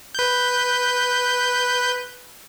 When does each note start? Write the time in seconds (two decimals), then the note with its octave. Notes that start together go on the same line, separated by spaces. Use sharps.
0.15 B4 G6